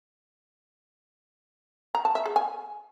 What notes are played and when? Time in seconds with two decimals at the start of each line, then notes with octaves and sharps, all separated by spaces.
1.95 A#5
2.05 A5
2.15 E5
2.26 G#4
2.36 G#5